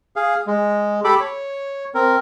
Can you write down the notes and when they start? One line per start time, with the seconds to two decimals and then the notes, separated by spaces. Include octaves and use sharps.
0.16 G#4 F5
0.47 G#3
1.04 G4 A4 B5 D6
1.20 C#5
1.95 C4 A#4